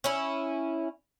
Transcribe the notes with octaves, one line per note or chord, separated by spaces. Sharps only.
C#4 E4